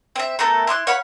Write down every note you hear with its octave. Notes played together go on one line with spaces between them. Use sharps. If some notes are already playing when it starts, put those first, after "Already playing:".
C4 E5
A3 B3 A4 A#4
E4 C6 D6 F#6
C#5 F5 F#5 B5